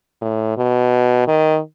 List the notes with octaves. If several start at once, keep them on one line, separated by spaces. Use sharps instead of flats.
A2
B2
D#3